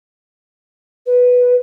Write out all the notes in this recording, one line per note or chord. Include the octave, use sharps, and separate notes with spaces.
B4